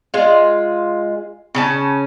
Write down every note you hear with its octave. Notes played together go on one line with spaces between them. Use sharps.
G#3 F4
C#3 C#4 A5